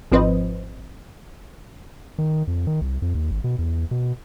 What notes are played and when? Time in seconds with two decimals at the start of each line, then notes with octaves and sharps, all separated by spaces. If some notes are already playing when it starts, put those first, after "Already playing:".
0.12 G#1 F3 C4 B4 C5 D#5
2.18 D#3
2.47 F2
2.67 D#3
2.81 C2
3.02 F2
3.15 D#2
3.31 G#1
3.44 B2
3.58 E2
3.91 B2